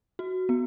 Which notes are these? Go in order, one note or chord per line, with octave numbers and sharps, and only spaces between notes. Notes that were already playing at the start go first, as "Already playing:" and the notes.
F#4
B3